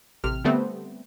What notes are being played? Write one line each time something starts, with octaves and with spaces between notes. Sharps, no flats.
A1 C3 F6
D3 G3 A3 B3 C4